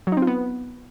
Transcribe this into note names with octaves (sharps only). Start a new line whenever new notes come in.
F#3
D#4
C4
F4
B3